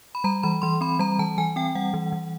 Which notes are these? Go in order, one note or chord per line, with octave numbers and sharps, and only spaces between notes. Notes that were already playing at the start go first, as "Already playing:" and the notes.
B5
G3 A#5
E3 B5
E3 C6
C4 B5
G3 A#5
E3 A5
E3 G#5
C4 G5
G3 F#5
E3
E3